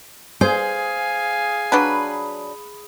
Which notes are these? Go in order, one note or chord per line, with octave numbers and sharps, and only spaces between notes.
G#4 C5 F5 G#5
F#3 D4 B4 B5